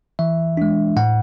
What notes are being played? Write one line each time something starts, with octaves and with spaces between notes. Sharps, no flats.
E3 E5
G#3 D4
A2 F#5